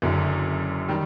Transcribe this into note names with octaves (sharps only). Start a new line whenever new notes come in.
F#1 F#2 D3
D#3 G3